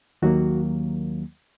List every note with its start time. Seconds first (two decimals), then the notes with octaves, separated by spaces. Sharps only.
0.22 D#2 D#3 F#3 A#3 F#4